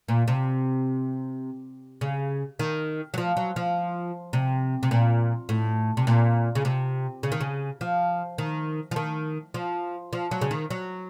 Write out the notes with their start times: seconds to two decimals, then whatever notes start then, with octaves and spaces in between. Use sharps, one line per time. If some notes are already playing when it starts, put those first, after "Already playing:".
0.08 A#2
0.28 C3
2.01 C#3
2.59 D#3
3.14 F#3
3.18 F3
3.37 F#3
3.56 F3
4.33 C3
4.83 C3
4.91 A#2
5.49 A2
5.97 C3
6.07 A#2
6.55 C#3
6.65 C3
7.23 C#3
7.32 D#3
7.41 C#3
7.81 F3
8.38 D#3
8.91 F3
8.96 D#3
9.54 F3
10.13 F3
10.31 F#3
10.41 C#3
10.51 D#3
10.70 F#3